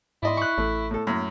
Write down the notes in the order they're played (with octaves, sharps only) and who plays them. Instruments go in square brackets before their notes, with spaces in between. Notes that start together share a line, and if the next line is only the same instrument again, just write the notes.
[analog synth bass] G#2 [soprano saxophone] E4 [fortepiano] D5 D#5 C6
[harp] C#6 F#6
[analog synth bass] A1 [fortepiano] A3
[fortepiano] A2 A4
[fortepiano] F#2 A2 [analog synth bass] A#3